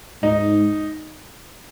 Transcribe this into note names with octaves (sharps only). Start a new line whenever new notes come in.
G#2 D#4